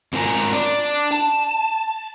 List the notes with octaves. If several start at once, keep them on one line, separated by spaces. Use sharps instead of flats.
G#2 C4 F4 A#4 G#5 A#5
D4 D5
A5